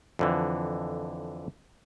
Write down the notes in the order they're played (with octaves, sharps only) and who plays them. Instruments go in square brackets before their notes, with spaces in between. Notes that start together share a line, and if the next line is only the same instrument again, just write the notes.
[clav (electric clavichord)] F2 D3 E3